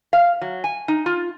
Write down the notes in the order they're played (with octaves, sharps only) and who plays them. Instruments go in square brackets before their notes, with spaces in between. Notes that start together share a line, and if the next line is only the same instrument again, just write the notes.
[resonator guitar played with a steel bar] F5
F#3
G#5
D#4
F4